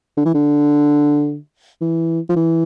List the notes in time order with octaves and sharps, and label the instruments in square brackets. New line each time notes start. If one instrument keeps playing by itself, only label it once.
[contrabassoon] D3
E3
D3
E3
F3
E3